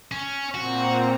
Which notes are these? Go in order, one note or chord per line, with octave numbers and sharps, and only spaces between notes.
C#4
A#2 C4 F#4 A#5